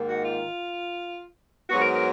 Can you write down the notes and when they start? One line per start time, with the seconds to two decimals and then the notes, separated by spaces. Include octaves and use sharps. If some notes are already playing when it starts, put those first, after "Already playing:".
Already playing: G#2 D#3 A#3
0.09 F#4
0.25 F4
1.70 G#2 F#3 B3 F#4
1.82 A#4
1.93 A#4